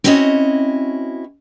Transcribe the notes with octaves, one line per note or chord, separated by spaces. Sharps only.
C4 C#4 E4 F#4 C#5 D#5